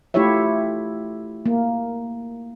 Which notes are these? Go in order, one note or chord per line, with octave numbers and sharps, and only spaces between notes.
A3 E4 F4 G4 C#5 E5
A#3